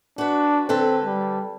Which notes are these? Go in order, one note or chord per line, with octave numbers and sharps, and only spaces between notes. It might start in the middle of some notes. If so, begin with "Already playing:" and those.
D4 F#4 B4
D3 C4 A4 B4
G3